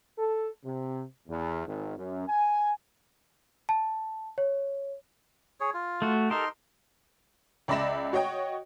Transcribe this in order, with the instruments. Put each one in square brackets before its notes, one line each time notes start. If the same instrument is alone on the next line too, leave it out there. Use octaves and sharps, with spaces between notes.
[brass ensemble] A4
C3
E2
G#1
F#2
G#5
[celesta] A5
C#5
[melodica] G#4 C#5
F4
[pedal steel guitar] A3 F#4
[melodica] D#4 C6 [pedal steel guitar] G4 A4 A#4
[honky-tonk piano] C#2 D5 E5 B5 A#6 E7
F#4 C#5 D#5 G5